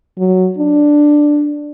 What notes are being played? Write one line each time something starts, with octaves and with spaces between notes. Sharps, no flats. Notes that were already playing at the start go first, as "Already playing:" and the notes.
F#3
D4